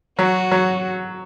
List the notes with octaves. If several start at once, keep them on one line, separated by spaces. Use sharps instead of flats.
F#3 F#4
F#3